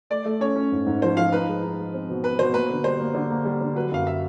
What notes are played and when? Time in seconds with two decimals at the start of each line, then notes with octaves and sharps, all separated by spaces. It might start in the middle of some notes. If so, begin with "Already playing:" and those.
0.10 A3 D5
0.25 A3
0.41 C#4 C#5
0.56 C#4
0.72 G#2
0.86 G#2
1.02 F3 C5
1.17 F3 F5
1.32 D#4 B4
1.48 G#3
1.63 D#4
1.78 G#3
1.94 C4
2.09 B2
2.23 C4 B4
2.39 B2 C5
2.54 A#3 B4
2.70 D3
2.84 G3 C5
3.00 A#3
3.15 D3
3.31 A#3
3.45 G3
3.61 D3
3.75 F#3 B4
3.92 F#2 F5
4.07 E5